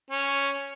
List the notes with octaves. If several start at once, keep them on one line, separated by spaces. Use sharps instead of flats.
C#4